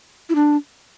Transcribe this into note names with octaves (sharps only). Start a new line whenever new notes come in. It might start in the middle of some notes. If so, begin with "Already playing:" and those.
E4
D4